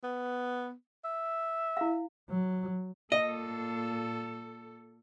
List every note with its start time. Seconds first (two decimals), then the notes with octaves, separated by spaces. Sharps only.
0.04 B3
1.05 E5
1.77 E4 F5
2.29 F#3
3.12 A#2 A4 D#5